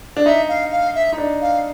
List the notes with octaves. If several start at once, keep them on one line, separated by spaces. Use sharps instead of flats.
D4
D#4 E5
F5
F5
E5
D#4
D4
F5